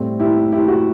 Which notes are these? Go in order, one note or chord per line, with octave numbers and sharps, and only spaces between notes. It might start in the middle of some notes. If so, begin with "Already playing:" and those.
Already playing: A2 G3 C4
E4 G4
E4 G4
F#4